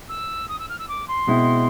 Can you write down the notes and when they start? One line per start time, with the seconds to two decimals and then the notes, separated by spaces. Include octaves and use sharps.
0.08 E6
0.48 D#6
0.58 E6
0.68 F6
0.78 E6
0.88 D6
1.07 C6
1.27 B2 G#3 C4 E4